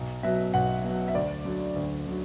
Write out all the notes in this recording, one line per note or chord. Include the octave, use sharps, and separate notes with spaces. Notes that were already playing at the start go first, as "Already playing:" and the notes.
Already playing: B1
B2 F#3 E5
B1 F#5
B2 F#3
E5
D2 D5
D3 F#3
D2
D3 F#3